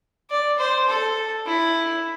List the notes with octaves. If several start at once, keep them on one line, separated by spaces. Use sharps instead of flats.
D5
C5
A4
E4